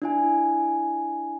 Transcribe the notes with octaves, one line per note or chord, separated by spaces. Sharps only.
D4 E4 G#5